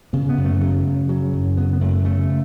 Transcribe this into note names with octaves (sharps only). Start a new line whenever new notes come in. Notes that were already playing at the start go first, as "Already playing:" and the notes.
C#3 B3
B3
F#2
A3
C#3 F#3
F#2
C#3 F#3
F#2
C#3 B3
B3
F#2 A3
C#3 A3